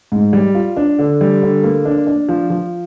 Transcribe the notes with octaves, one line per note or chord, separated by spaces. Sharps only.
G#2
G3
F4
D4
D3
G3
D3
A#3
D4
D4
F3
F3